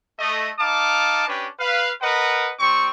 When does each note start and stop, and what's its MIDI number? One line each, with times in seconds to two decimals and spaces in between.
0.19 0.49 57
0.19 0.49 75
0.58 1.26 63
0.58 1.26 77
0.58 1.26 81
0.58 1.26 86
1.28 1.48 61
1.28 1.48 62
1.28 1.48 67
1.28 1.48 71
1.60 1.91 71
1.60 1.91 77
2.02 2.52 70
2.02 2.52 71
2.02 2.52 75
2.02 2.52 78
2.58 2.90 55
2.58 2.90 60
2.58 2.90 85